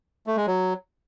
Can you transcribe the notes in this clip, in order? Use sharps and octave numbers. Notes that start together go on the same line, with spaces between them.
A3
G#3
F#3